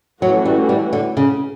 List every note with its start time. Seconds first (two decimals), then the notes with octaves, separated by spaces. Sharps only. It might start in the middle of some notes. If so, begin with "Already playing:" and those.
0.22 E3 F#3 A3 C#4 F#4
0.45 G3
0.69 G3
0.93 D3
1.17 C#3